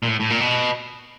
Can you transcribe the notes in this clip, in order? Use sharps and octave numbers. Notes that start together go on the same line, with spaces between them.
A#2
A2
A2
A#2
B2